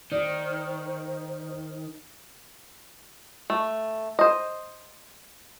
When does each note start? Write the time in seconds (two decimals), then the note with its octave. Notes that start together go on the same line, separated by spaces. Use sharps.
0.12 D#3 C5 D5
3.50 A3
4.19 C5 D#5